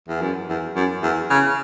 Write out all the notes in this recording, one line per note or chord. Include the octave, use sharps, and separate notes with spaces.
E2
F#2
E2
F#2
E2
C#3